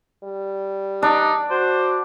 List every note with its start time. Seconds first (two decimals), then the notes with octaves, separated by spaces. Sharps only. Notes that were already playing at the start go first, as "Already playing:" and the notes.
0.24 G3
1.03 D4 D#4
1.51 F#4 C5